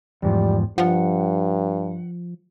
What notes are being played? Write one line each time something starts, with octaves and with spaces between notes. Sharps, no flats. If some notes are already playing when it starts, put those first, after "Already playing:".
E2 G#2 F3 G3
G2 F3 F#5